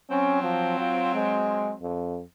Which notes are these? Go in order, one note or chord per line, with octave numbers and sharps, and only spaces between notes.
F#3 C4 C#4
F3
F4
G#3
F2